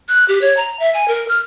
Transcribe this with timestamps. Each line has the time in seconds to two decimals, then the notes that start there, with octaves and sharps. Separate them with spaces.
0.09 F#6
0.28 G4
0.41 C#5
0.57 A#5
0.80 E5
0.94 G#5
1.08 A#4
1.28 F6